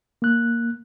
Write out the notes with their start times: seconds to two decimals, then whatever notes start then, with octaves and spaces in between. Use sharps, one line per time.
0.22 A#3 F#6